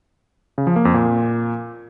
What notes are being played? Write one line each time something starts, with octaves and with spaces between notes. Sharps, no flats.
C#3
F3
A#3
F2
A#2